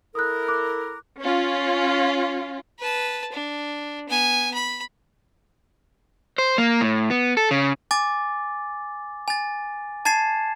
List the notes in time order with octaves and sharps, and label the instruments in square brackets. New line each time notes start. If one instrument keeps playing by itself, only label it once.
[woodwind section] E4 A4 A#4 [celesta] D#6 F#6
[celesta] D6 F#6
[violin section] C#4 F4
[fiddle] B4 A5
D4
B3 G#5
B5
[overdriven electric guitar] C5
A#3
A2
B3
A4
C#3
[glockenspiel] G#5 D6 A6
G#5 A6
A5 G#6 A6 C7 E7